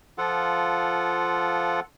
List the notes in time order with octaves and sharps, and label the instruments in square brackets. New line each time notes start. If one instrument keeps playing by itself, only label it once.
[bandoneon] F3 F4 A4 F#5